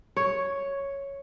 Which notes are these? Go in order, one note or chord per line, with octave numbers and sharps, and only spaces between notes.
C#5